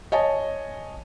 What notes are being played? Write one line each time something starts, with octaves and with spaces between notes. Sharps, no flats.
C#5 D#5 G#5 A5